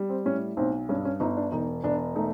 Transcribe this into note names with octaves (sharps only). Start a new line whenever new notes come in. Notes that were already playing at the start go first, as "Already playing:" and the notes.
Already playing: G3
C4
A2 C#4
B1 C4
G2 C#4
C#4
G1 D#4
D4
E1 D#4
E1 D4
A3 D#4